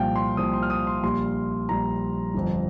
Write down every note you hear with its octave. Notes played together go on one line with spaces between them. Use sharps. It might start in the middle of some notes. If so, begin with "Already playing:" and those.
Already playing: C2 A#2 F3 F5 G5
C6
C2 A#2 F3 D#6
C6
F6
D#6
C6
A#1 A#2 G3 C6
A#1 A#2 G3 A#5
G1 F2 F3